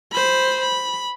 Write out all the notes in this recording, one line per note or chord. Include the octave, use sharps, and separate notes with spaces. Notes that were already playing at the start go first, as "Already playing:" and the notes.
C5 B5
B5